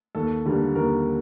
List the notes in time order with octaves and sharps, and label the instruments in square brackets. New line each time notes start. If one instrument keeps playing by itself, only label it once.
[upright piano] D#2 A4
D3 G3 A#3
D#2 A#4